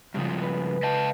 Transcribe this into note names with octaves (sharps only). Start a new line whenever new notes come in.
G2 C#3 F3 G#3 C4
B4
D#5 F5 G5 A5